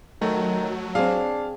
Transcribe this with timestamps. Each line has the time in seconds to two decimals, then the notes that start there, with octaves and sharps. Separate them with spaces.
0.22 D#3 F#3 A3
0.95 C4 D4 G#4 F5